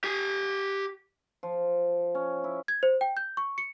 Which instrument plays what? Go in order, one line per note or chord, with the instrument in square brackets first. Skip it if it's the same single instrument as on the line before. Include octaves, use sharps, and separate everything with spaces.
[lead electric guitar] G4 G#5
[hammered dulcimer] F3
C#4
E4
[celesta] G#6
C5
G5
G6
C#6
C#7